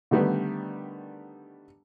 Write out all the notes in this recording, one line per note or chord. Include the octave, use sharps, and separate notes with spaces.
D3 D#3 G3 A3 B3